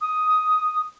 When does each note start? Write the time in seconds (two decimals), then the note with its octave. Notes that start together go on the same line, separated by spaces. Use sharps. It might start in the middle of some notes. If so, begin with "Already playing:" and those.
0.01 D#6